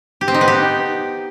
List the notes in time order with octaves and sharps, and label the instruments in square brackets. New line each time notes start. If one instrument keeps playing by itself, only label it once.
[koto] G4
C4
D#4
B3
G4